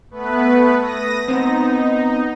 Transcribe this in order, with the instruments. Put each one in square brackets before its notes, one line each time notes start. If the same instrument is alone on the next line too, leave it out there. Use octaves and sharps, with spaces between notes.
[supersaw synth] A3 B3 B4
D#6 A#6
[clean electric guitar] B3 C4 [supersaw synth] D#4